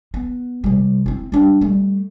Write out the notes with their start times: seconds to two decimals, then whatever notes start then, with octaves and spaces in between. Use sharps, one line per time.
0.14 B3
0.64 C3 G3
1.06 C4 E4
1.32 G3 D4
1.61 G3 A3